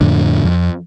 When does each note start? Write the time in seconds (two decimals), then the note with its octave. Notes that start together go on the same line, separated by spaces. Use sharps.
0.01 F2 A2 D3
0.44 F2